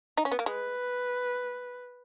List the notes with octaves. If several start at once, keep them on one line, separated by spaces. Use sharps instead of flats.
D#4
C#4
B3
A#3
G#3 B4